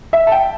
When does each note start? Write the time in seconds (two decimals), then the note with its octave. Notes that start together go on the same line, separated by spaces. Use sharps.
0.13 E5
0.27 A5
0.32 G5